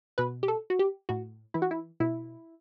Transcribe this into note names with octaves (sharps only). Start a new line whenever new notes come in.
B2 B4
G4
A4
F#4
G4
A2 F#4
E3 E4
F#4
E4
B2 E4